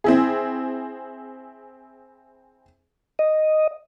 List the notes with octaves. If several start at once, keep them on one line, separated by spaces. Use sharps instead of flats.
C4 E4 G#4
D#5